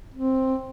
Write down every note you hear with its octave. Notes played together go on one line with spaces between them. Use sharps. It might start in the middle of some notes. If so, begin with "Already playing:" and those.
C4